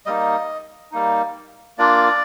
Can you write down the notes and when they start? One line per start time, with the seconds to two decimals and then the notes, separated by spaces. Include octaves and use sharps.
0.06 G3 A#3 D#4 D#5
0.92 G3 A#3 D#4
1.78 A#3 D4 F4 D5